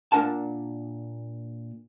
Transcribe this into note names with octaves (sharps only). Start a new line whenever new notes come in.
A#2 C#4 D4 A#4 F#5 A5